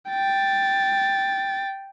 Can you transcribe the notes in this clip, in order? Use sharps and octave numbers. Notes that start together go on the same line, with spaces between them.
G5 A6